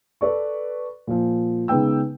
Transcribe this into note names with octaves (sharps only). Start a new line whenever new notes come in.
A4 B4 D5 C#6
A#2 F3
C#3 G#3 B3 D#4 G5 E6